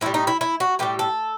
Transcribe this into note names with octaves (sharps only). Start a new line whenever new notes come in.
A2 E3 G3 E4
D#4
E4
E4
F#4
A2 E3 G3 G4
A4